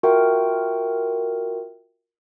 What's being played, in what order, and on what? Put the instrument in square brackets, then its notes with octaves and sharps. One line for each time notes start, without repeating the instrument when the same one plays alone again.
[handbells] F4 F#4 A#4 E5 F#5 G5